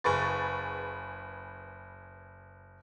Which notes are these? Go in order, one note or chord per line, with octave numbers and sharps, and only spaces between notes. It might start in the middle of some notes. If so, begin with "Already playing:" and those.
F#1 G#4 B4 C#6 A6